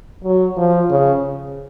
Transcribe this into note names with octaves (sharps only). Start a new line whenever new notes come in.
F#3
F3
C#3